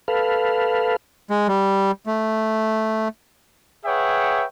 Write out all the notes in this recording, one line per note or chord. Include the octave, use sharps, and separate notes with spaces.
A4 B4 F5
G#3
G3
A3
G#4 B4 C#5 E5 F#5 G5